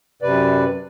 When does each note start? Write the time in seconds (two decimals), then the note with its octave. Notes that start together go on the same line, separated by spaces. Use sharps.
0.22 F#2 C3 B4 D5